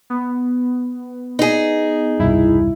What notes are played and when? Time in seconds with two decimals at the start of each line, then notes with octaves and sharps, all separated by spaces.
0.10 B3
1.39 D#4 G#4
2.20 E1 C2 G2 E4